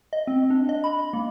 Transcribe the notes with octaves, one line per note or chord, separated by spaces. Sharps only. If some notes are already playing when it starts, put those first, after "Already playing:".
D#5
C4
D4
D#5
B5
A#3